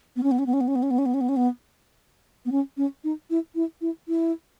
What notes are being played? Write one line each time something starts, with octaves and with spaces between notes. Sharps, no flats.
B3
C#4
B3
C#4
B3
C#4
B3
C#4
B3
C#4
B3
C#4
B3
C#4
B3
C#4
B3
B3
C#4
C#4
D#4
E4
E4
E4
E4